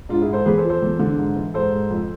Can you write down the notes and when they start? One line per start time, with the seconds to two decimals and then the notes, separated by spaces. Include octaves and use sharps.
0.09 G#2 D4 F4
0.21 E4 G#4
0.28 G#2
0.33 A4 C5
0.46 E2 G#4 B4
0.58 A4 C5
0.63 F3
0.69 A4 C5
0.82 E2
0.99 D3
1.18 G#2
1.36 E3
1.54 G#2 A4 C5
1.72 G#2
1.91 F2